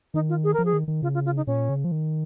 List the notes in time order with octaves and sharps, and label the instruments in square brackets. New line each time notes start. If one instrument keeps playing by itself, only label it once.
[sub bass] D#3 [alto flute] D#4
[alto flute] F4
G#4
[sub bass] F3 [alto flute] A#4
[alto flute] G#4
[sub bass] D#3
D#3
[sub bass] C#3 [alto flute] F4
[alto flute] F4
F4
D#4
[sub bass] A#2 [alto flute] C#4
[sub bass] C#3
F3
D#3